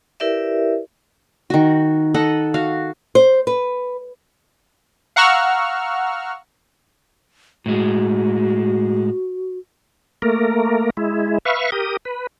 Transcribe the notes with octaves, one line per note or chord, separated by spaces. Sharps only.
E4 G4 A#4 B4 D5 E5
D#3 F#4
A4 D#5 F#5
F#4 F5
C5
B4
F5 F#5 A#5 C#6 E6 F6
A2 G#3 F#4
A3 A#3 A#4
G#3 E4
B4 E5 F5 C#6
G4 A#4 D#6
B4